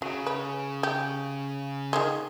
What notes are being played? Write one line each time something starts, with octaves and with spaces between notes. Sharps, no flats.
C#3 F#3
B4
G4
D#3 F3 G#3